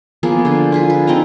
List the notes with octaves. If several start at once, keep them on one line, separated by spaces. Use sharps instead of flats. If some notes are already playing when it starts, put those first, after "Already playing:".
F3 A#3 B3 G#4
D3 C5
F4 G#4 B4
B4
C4 D#4 G5 A#5